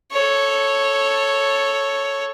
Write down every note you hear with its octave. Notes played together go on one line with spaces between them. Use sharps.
A4 C#5